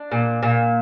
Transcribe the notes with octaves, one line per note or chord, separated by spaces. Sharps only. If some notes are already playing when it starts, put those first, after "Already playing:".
Already playing: D4
A#2
A#2